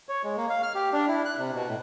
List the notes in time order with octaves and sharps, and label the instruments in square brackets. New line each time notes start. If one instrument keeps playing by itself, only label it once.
[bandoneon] C#5
G#3
A#3
F5
F6
G4
D4
E4
F#6
C3
B2
A2